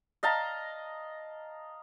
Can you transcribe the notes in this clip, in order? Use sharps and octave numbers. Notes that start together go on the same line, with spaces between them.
D#5 F5 A5 A#5